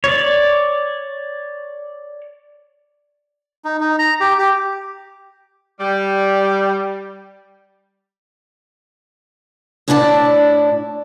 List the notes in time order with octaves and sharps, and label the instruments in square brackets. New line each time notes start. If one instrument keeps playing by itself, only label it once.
[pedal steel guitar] C#5 D5
[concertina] D#4
D#4
A#5
G4
G4
[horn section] G3
[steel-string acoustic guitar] A2 D4 E4 D5 G5 A5